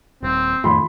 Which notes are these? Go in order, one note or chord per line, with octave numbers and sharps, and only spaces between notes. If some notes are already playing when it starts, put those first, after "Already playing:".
D#1 C4
F2 A2 D#3 F3 F4 B5 C6